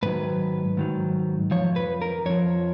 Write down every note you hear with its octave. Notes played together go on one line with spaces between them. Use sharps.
G#2 D#3 F#3 B4
G#2 D#3 F#3
F2 F3 C#5
B4
A#4
F2 F3 C#5